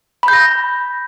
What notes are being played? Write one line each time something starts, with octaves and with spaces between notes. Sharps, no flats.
B5
G6
A#6